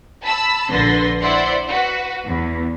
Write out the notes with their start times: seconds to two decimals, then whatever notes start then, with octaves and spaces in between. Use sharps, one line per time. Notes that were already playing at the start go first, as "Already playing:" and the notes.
0.24 A5 B5 E6
0.70 A#1 D3 B4 C6 A#6
1.21 E4 C5 D5 E5 F#5 C6
1.68 F#4 B4
2.26 E2